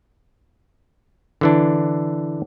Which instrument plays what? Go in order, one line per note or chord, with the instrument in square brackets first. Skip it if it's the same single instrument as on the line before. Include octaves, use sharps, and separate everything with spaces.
[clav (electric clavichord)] D3 E3 D4